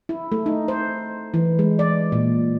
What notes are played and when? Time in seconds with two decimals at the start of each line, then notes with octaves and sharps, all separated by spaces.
0.09 E4
0.32 A3
0.46 D#4
0.68 C5
1.34 E3
1.59 G#3
1.79 D5
2.12 A#2